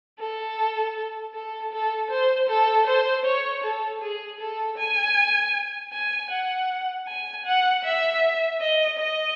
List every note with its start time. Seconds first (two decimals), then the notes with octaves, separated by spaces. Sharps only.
0.19 A4
1.34 A4
1.72 A4
2.10 C5
2.49 A4
2.87 C5
3.25 C#5
3.64 A4
4.01 G#4
4.40 A4
4.78 G#5
5.93 G#5
6.30 F#5
7.07 G#5
7.46 F#5
7.84 E5
8.60 D#5
8.98 D#5